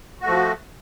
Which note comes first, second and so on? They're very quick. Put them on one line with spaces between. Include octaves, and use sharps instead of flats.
F#4 A3 F3